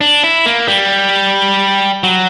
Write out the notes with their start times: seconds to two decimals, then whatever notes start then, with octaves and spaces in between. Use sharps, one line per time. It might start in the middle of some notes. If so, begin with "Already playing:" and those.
0.01 D4
0.24 E4
0.46 A#3
0.68 G3
2.04 F#3